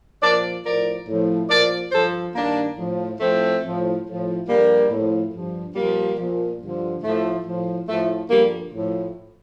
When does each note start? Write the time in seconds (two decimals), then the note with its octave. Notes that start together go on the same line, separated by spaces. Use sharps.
0.21 A#2 F3 A#4 D5
0.64 A2 F3 A#4 D5
1.08 A2 F3
1.49 A#2 F3 A#4 D5
1.92 G2 F3 A4 C5
2.34 G2 D#3 A#3 D4
2.77 A2 F3
3.19 A2 F3 A3 C4
3.62 A2 F3
4.05 A2 F3
4.47 G2 D3 F3 G3 A#3
4.90 A2 F3
5.32 G2 F3
5.74 A#2 F3 G3 A#3
6.17 A#2 F3
6.61 G2 D3 F3
7.02 A2 F3 A3
7.45 A2 F3
7.87 A2 F3 A3
8.29 G2 D3 F3 G3 A#3
8.73 A2 F3